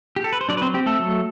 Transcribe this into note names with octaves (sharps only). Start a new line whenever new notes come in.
G4
A4
B4
C5
F#3 D4 D5
B4
C4 C5
C4 G4
A3 A4
F#3